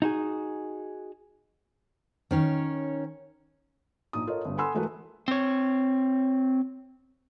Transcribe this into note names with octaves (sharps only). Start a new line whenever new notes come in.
D#4 F#4 G#4
D#3 C#4 C#5
A#1 D#4 D#6
F4 A4 A#4 C#5 D#5
G1 G2
A4 F#5 G#5 B5 C6 E6
E3 G#3 A3 F#4 A#4 B4
C4 C#5